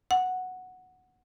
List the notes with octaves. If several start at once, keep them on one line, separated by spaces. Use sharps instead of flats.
F#5